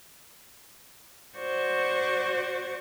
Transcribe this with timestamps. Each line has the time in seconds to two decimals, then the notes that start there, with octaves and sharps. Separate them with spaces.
1.37 F#4 C5 D5 C#6